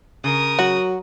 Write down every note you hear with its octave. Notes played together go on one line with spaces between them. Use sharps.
C#3 A#4 D#6
F#3 F#4